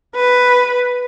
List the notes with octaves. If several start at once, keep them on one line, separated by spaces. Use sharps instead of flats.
B4